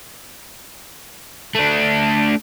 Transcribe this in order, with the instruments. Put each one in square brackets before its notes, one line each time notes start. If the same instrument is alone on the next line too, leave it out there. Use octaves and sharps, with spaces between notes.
[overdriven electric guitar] A3 D4